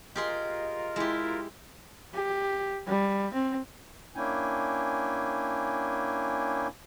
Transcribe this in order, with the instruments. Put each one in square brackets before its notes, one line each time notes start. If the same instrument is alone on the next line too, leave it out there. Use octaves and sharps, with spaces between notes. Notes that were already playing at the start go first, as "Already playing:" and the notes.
[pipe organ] F4 A#4 [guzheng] G4 G#4 C6 [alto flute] D#5
[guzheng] G#3 G4 [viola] E4
[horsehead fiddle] G4
G3
C4
[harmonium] A#3 C#4 D4 E4 G5 G#5